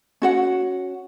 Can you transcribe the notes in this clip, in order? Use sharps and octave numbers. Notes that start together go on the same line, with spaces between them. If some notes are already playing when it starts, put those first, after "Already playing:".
C#4 F#4 F#5